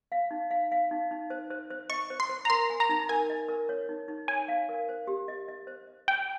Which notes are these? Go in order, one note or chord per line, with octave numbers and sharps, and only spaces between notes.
F5
D#4
F5
F5
D#4
D#4
C5
C5
C5
D#5 C#6
C5
C6
C5
A#5
A#4 C6
G#5
A#5
D#4
A#4 G#5
D#5
A#4
C#5
D#4
D#4
C#5 G#5
F5
A#4
C5
G4
D#5
D#5
C5
D#5
G5 G#5